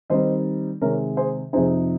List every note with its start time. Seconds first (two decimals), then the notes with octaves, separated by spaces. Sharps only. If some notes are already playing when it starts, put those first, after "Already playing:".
0.10 D#3 G3 C4 D#4 C5 D#5
0.81 C3 D#3 G#3 A#4 C#5
1.17 G#4 C5
1.53 F2 C3 F3 C4 D#4 G#4 C5